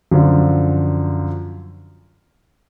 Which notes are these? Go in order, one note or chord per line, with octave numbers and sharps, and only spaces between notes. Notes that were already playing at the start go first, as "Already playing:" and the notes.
F#2 D3 F3